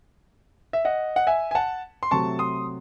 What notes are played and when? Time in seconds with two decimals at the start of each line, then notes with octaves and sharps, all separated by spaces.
0.73 E5
0.85 D#5 F#5
1.16 F#5
1.27 E5 G#5
1.51 G#5
1.55 F#5 A5
2.03 C6
2.11 C3 F#3 A3 A5 C#6
2.39 C6 D#6